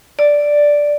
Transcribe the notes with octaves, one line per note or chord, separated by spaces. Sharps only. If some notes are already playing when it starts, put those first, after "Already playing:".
D5